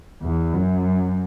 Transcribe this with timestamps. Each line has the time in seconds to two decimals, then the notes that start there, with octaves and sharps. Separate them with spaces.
0.22 E2
0.53 F#2